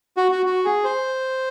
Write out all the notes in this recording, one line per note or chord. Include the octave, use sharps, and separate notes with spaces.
F#4
F#4
F#4
G#4
C5